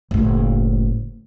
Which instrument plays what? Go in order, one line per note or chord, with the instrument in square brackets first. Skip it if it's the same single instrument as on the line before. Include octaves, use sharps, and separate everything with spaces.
[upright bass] F#1 A2